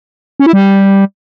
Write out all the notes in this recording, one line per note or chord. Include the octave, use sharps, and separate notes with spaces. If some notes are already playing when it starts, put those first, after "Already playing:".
C#4
E4
G3